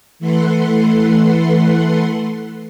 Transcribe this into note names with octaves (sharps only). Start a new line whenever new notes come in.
E3 A3 A4 B4 F#5 C6